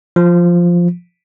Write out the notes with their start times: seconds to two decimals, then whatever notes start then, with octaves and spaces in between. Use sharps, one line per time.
0.16 F3